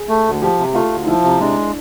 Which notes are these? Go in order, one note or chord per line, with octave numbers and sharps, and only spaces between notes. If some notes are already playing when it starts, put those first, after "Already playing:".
Already playing: G#4
A3
D2
F3 G4
C3
A3 F4
D2
D#4
F3 E4
C3
G#3 D4